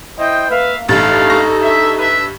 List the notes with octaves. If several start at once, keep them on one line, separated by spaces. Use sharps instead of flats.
E4 C5 D#5 G5
A#3 B4 E5 F5
A1 G2 G#3 A3 D#4 A4 F5 A6
G2 C#6 A#6
E5
B4 E5